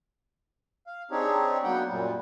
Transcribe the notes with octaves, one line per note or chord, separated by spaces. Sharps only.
F5
C4 D4 D#4 G4 G#4 C#5
F#3 G3 A#3 B3 F#5 G5
F#2 A#2 G3